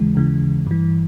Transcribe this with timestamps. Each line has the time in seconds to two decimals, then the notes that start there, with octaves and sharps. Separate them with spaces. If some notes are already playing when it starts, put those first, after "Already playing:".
Already playing: D#2 C#3 E3 G#3
0.15 D#2 C#3 E3
0.67 G2 E3